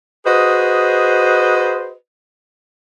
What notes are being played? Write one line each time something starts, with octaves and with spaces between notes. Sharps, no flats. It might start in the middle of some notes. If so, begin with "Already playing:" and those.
F#4 G#4 B4 C5 D#5